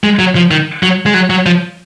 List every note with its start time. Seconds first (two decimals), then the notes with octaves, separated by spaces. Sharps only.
0.04 G#3
0.19 F#3
0.36 F3
0.51 D#3
0.83 F#3
1.06 G#3
1.14 F#3
1.30 F#3
1.46 F3